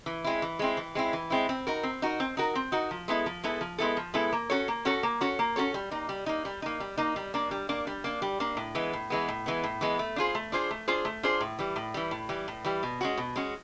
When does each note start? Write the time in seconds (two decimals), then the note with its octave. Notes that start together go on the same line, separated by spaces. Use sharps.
0.06 E3
0.24 G#3 C4 E4
0.42 E3
0.59 G#3 C4 E4
0.77 E3
0.95 G#3 C4 E4
1.13 E3
1.30 G#3 C4 E4
1.49 C4
1.67 D#4 F#4 A#4
1.83 C4
2.02 D#4 F#4 A#4
2.20 C4
2.37 D#4 F#4 A#4
2.55 C4
2.72 D#4 F#4 A#4
2.91 F3
3.08 G#3 B3 E4 A4
3.26 F3
3.44 G#3 B3 E4 A4
3.61 F3
3.78 G#3 B3 E4 A4
3.97 F3
4.14 G#3 B3 E4 A4
4.33 A#3
4.50 C#4 F#4 A4 C#5
4.68 A#3
4.85 C#4 F#4 A4 C#5
5.03 A#3
5.21 C#4 F#4 A4 C#5
5.39 A#3
5.56 C#4 F#4 A4 C#5
5.74 G3
5.91 A#3 D#4
6.09 G3
6.26 A#3 D#4
6.45 G3
6.62 A#3 D#4
6.80 G3
6.97 A#3 D#4
7.16 G3
7.34 A#3 D4
7.51 G3
7.69 A#3 D4
7.87 G3
8.04 A#3 D4
8.22 G3
8.40 A#3 D4
8.57 A2
8.75 E3 G#3 B3
8.93 A2
9.10 E3 G#3 B3
9.29 A2
9.46 E3 G#3 B3
9.64 A2
9.81 E3 G#3 B3
9.99 A3
10.16 D4 F4 G#4 C5
10.35 A3
10.52 D4 F4 G#4 C5
10.71 A3
10.88 D4 F4 G#4 C5
11.05 A3
11.23 D4 F4 G#4 C5
11.41 A2
11.59 E3 G3
11.76 A2
11.94 E3 G3
12.11 A2
12.29 E3 G3
12.48 A2
12.65 E3 G3
12.83 B2
13.01 G#3 C#4 F#4
13.17 B2
13.36 G#3 C#4 F#4